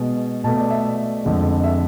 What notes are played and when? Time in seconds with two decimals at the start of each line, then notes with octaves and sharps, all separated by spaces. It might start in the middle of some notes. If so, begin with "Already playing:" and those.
Already playing: B2 G#3
0.44 B2 A3 A5
0.57 D5
0.70 E5
1.23 F2 D3 G#3
1.64 E5